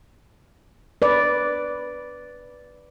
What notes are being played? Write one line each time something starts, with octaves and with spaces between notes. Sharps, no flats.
B4 D5